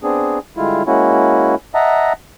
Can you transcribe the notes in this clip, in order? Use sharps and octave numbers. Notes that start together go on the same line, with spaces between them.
B3 C4 D4 G#4
D3 G3 G#3 E4 F4
G#3 A#3 C#4 E4 F#4
D#5 E5 F#5 A5 A#5